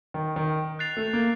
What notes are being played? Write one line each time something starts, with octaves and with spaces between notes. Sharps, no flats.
D#3
D#3
F#6 A6 C7 F7
A3
A#3